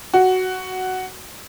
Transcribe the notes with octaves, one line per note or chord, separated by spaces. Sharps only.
F#4